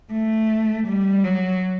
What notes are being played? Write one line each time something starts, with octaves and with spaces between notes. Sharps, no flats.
A3
G3
F#3